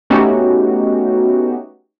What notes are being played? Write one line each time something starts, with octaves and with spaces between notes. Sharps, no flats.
A3 B3 C#4 D#4 F#4 G4